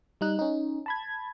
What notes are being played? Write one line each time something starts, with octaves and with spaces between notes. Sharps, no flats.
G3 D#4 F#6
C#4 D#4
A5 B5 G#6